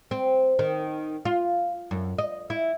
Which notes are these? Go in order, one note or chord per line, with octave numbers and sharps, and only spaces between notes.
C4
D#3
F4
F#2
D#5
E4